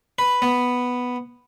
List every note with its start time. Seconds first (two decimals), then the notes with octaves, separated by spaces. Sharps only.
0.19 B4
0.42 B3